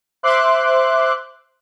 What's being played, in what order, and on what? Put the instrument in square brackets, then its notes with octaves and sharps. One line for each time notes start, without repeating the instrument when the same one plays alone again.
[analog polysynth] C5 E5 C6 D6 F#6